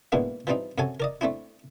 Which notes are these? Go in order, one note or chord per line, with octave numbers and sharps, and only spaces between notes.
G#2 B2 E3 G#3 A#3 D4
E3 F3 G3 C4 D#4
F#2 C3 F#3 A4 G#5
A#4 D5 D#5
A3 C4 D4 E4